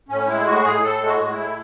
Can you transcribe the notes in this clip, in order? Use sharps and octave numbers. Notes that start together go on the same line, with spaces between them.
A2 C#4
G#3 E4
A2 F#4
A2 G#4
A2 A4
G#3
F#4
A2
E4
A2